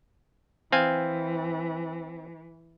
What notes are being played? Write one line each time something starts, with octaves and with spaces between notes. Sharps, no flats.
E3 C4 F5 G#5